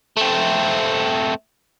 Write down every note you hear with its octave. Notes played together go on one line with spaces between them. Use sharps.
A3 C4